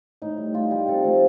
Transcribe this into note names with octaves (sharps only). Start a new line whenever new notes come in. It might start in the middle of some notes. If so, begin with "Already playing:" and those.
A2 D#4
G3
A2 F4
G3 G4
C3 A4
F3 A3